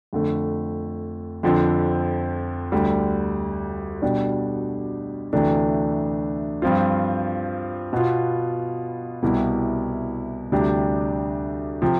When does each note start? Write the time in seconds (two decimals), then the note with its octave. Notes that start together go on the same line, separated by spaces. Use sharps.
0.13 F2 D3 A3
1.43 F2 D3 F3 C4
2.72 D2 D3 G3
4.02 B2 G3 D4
5.33 D2 C3 E3 A3 D4
6.62 G2 F3 C4 F4
7.93 B2 B3 F4
9.22 C2 B2 B3 E4 G4
10.52 D2 C3 G3 D4 G4
11.82 C3 F3